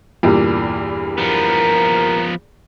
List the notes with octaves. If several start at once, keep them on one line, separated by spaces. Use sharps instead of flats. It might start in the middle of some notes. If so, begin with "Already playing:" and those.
E2 G2 A#2
F3 B3 A#4